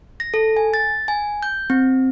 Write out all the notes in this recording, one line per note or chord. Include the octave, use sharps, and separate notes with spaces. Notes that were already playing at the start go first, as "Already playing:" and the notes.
A#6
A4
G#5
A6
G#5
G6
C4